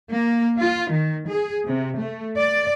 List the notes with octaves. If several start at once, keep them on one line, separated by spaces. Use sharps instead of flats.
A#3
F4
D#3
G#4
C3
A3
D5